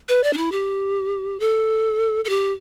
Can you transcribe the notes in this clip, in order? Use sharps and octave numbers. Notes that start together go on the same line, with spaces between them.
B4
D5
D4
E4
G4
A4
A4
G4